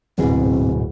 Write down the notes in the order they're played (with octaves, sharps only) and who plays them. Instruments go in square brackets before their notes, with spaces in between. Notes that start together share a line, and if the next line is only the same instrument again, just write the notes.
[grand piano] D1 [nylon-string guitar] G#2 B2 G#4 [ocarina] C4